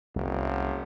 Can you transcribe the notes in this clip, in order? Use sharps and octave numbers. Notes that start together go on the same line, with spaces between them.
F#1 C2 C3